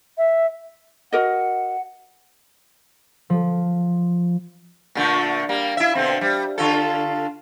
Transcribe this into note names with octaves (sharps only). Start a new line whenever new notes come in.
E5
F#4 A#4 D#5 F#5
F3
A#2 D3 A3
G3 A#3
E4 E5
B2 D3 C4
G3
D3 F4 A4